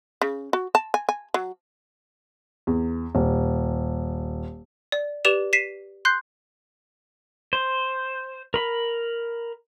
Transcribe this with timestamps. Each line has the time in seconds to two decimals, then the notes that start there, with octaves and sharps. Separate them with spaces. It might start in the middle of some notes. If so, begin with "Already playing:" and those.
0.22 C#3
0.53 F#4
0.75 A5
0.94 G#5
1.09 G#5
1.34 F#3
2.67 E2
3.15 D#1
4.92 D5
5.25 G4 B4 D5 E7 F7
5.53 B6 C7 D#7 E7
6.05 C6 F#6 G6 C7
7.53 C5
8.54 A#4 B5